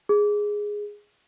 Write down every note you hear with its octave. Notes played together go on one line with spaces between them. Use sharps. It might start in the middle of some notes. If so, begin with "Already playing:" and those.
G#4